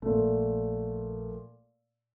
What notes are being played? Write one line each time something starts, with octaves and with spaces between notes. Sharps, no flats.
A#1 A#2 A3